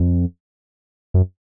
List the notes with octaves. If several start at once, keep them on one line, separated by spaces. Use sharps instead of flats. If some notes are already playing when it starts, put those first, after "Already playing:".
Already playing: F2
F#2